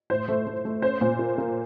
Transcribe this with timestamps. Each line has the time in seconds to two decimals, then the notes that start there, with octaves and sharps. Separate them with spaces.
0.10 A2 C5
0.28 A3
0.47 A3
0.65 A3
0.82 C#4 C5
1.01 A#2
1.19 A#3
1.38 A#3